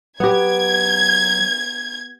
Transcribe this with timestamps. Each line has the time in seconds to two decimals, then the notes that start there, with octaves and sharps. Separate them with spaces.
0.20 F#3 B3 G4 G#6